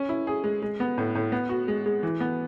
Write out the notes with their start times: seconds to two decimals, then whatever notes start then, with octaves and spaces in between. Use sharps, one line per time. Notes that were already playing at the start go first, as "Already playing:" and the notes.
Already playing: C#4
0.09 E4
0.27 G#4
0.44 G#3
0.62 G#3
0.80 B3
0.98 A2
1.15 A2
1.32 B3
1.49 F#4
1.68 G#3
1.86 G#3
2.03 E3
2.20 B3